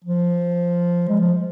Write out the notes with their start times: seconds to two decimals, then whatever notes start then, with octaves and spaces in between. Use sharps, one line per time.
0.04 F3
1.09 G#3
1.20 F3